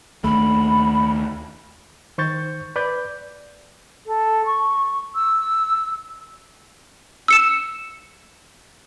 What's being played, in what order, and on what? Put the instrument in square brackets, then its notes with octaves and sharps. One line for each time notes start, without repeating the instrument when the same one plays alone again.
[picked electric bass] D#2 A3 [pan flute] B5
[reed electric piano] D#3 C5 C#6 G6 A6
B4 D5 G6
[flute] A4
C#6
E6
[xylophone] E6 C#7 E7